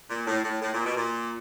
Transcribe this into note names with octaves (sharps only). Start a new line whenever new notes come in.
A#2
A2
A2
A2
A#2
B2
A#2